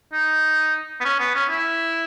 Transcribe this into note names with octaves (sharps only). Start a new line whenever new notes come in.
D#4
B3
C#4
B3
C#4
E4